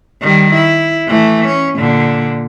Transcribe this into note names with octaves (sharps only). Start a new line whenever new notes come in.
D#3 G3
E4
E3 A3
C#4
A#2 D3